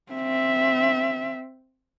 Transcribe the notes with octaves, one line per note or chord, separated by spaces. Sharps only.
C4 E5